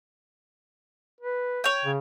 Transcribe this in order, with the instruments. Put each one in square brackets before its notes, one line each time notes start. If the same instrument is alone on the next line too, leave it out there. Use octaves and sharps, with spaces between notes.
[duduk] B4
[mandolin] C#5 G5
[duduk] C#3